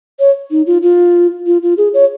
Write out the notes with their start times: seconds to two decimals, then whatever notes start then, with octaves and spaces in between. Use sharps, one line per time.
0.20 C#5
0.51 D#4
0.67 F4
0.82 F4
1.47 F4
1.63 F4
1.78 G#4
1.94 C#5